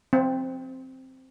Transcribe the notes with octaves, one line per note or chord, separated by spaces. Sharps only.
C4